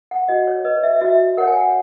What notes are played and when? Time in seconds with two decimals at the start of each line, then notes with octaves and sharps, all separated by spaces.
0.11 F#5
0.28 F#4 D#5
0.47 C#5
0.65 B4 D#5
0.83 E5
1.01 F#4 E5
1.37 A#4 C#5 F#5
1.47 G#5
1.57 F#5